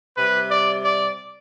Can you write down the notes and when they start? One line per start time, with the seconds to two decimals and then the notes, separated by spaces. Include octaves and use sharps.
0.17 C3 G3 B4
0.50 D5
0.84 D5